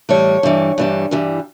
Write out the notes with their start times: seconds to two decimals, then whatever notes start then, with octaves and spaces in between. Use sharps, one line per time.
0.09 A2 E3 G3 C#5
0.43 G2 E3 G3
0.78 G2 E3 G3
1.11 G2 E3 G3